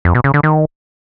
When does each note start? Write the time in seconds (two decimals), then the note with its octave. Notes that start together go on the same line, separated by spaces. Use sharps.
0.05 F2
0.15 B2
0.24 C#3
0.34 D3
0.43 D#3